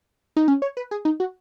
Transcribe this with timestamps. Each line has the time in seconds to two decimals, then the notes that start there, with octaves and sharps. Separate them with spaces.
0.36 D#4
0.48 C#4
0.62 C#5
0.77 B4
0.91 G#4
1.05 D#4
1.20 F#4